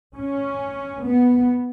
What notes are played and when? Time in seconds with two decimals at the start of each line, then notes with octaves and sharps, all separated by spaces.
0.16 C#4
1.04 B3